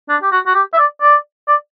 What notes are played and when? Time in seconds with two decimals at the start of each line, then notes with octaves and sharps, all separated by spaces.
0.09 D4
0.22 G4
0.32 F#4
0.46 F#4
0.55 G4
0.73 E5
0.78 D5
1.01 D5
1.48 D5